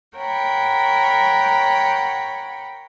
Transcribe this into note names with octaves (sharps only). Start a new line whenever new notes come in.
A#4 C#5 F#5 G5 B5